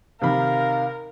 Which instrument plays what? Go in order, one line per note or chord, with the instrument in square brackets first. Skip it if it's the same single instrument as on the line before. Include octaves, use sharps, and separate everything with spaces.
[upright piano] C3 D#3 B5 [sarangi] A#4 [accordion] F5